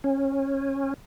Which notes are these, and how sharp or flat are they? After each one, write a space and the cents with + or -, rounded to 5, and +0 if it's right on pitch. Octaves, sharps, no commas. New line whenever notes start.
C#4 -20